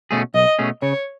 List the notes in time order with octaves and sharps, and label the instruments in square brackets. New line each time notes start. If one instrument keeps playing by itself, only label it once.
[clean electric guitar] B2 A3 C#4 G#4
[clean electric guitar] B1 [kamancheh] D#5
[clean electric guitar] B2 A3 C#4 G#4
[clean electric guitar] C#3 [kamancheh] C#5